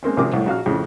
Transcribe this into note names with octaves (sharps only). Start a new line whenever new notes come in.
G#3 A#3 C4 C#4
G#1 C3 F3 G#4 A#4 D6
C2 A2
A#1 F#4 F5 F6
F2 A2 C#3